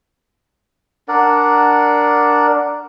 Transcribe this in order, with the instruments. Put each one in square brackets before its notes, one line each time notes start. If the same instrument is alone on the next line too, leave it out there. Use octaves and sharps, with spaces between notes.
[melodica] D4 A#4 D5 F#5